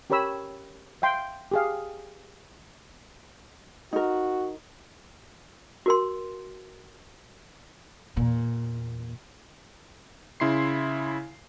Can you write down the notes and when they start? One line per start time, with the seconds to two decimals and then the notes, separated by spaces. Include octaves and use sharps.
0.10 C#4 G4 A#4 C#5 B5 E6
1.02 E5 F5 G5 C6
1.51 G4 G#4 F5
3.93 D#4 F#4 A#4
5.86 F#4 A#4 C6
8.17 E2 A#2
10.40 C#3 E4 C6 C7